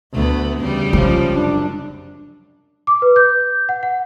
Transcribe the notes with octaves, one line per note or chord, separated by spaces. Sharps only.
D2 A3 B3
E2 C#3 G3
C3 F3 G#3 C#4
F#2 D4
D6
B4
G6
F#5
F#5